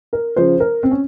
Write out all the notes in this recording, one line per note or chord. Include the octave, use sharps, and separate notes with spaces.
A#4
C#3 F3 C5
A#4
C4
C#4